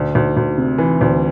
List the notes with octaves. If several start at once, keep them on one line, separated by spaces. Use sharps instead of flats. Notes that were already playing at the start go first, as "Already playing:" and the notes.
Already playing: D2
D2
D2
C3
E3
D2